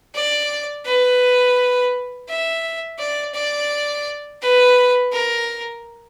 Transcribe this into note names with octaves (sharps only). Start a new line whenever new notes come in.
D5
B4
E5
D5
D5
B4
A#4